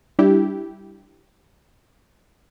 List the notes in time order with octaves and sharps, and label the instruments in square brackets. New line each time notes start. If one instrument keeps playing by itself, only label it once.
[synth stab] G3 D4 E4 G4